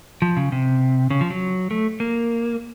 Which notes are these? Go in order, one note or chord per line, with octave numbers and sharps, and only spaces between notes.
F3
C#3
C3
C#3
F3
F#3
A3
A#3